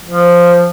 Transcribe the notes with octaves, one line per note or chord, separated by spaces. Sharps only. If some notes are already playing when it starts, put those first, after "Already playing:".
F3